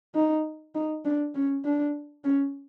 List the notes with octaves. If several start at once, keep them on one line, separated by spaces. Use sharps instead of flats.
D#4
D#4
D4
C#4
D4
C#4